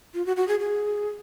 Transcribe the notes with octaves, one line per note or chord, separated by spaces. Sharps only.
F4
F#4
F#4
G#4
G#4